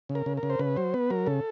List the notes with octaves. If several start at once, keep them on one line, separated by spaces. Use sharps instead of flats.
C#3
A#4
C#3
A#4
C#3
C5
C#3 B4
F#3 C5
B3 B4
F#3 A#4
C#3 A4